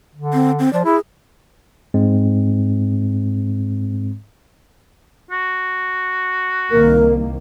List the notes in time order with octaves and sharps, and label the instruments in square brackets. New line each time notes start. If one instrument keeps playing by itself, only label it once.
[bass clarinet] D3
[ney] C4
C4
[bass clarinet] F3 [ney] D5
[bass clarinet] E4 [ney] G#4
[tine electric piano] G#2 G#3 C4
[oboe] F#4
[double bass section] C2 D#3 A#3 [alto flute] A#4